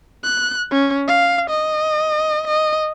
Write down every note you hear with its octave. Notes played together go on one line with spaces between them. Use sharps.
F#6
C#4
F5
D#5
D#5